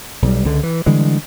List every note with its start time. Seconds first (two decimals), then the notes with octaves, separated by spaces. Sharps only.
0.22 B1 G3
0.45 C#2 D3
0.63 E3
0.86 D3 E3 G3 G#3